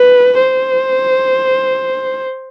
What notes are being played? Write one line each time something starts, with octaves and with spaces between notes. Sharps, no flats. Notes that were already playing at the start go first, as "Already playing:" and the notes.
Already playing: B4
C5